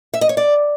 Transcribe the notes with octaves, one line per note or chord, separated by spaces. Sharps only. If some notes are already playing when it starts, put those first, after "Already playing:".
E5
D#5
C#5
D5